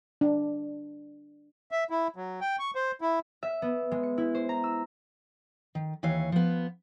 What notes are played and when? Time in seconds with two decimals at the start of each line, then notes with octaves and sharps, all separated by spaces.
0.21 D4
1.71 E5
1.90 E4
2.16 F#3
2.41 G5
2.59 C#6
2.75 C5
3.01 E4
3.43 E5
3.62 B3
3.92 G#3
4.03 C#7
4.18 E4
4.35 C5
4.49 A#5
4.64 E6
5.75 D#3
6.03 D#2 E3 C#5 F5
6.32 F3 B3